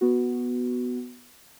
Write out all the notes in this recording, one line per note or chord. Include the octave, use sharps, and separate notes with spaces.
B3 F#4